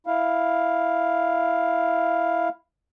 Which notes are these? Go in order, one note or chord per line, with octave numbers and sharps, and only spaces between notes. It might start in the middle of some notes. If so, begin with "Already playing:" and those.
E4 F5